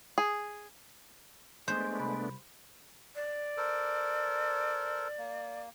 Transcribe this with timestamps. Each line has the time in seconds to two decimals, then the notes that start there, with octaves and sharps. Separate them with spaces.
0.18 G#4
1.68 G#3 A3 B3 D4 C5
1.99 C2 B5
3.15 D5
3.57 A4 A#4 C5
5.18 A#3